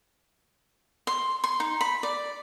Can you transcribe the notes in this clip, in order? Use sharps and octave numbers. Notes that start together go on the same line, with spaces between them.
C6
C6
D#4
B5
D5